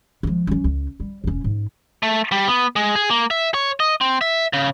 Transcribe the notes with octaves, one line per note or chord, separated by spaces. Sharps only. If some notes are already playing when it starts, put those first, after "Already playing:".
F3 G#3
F#3 C#4
C#2
G3
E1 C#4
G#2
A3
G3
B3
G#3
G#4
A#3
E5
C#5
D#5
C4
E5
C#3